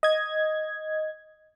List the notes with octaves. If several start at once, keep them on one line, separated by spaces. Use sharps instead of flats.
D#5 G#6